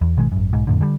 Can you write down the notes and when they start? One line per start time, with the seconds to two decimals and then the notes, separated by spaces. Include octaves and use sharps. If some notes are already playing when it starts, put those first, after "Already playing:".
0.01 E2
0.17 G#1 B2 D#3 G#3
0.32 G#1 F#2
0.53 B1 G#2
0.67 F2 A2 D3
0.81 D3 G3